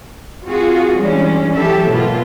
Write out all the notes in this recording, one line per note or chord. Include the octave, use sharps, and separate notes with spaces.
C4 F4 F#4 G#4
E3 G3 G#3 C#4 D4
E3 F#3 G3 G4 A4 E5
G#2 B2 A#3 B3 F4